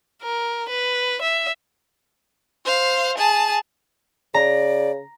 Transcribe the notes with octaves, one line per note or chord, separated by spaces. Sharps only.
A#4
B4
E5
C5 F5
G#4 A5
C#3 D5 A#5